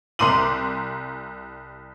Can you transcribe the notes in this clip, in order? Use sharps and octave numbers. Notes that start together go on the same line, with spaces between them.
C2 A#5 C6 D6 D#7 F#7